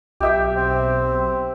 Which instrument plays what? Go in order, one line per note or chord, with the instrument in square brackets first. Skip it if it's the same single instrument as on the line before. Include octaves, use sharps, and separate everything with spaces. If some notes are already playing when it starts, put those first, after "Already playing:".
[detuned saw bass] B1 [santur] G4 E5 G5
[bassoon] C4